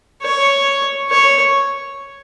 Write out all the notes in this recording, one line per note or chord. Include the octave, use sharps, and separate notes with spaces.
C#5
C#5